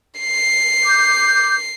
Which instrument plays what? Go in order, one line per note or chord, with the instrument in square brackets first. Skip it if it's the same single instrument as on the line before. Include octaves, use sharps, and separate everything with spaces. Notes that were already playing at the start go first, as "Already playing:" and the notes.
[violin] C7
[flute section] D6 G6